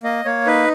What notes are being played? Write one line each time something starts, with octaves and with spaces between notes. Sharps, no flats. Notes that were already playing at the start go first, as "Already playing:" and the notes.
A#3 D#5
A#3 C#5
D#4 B4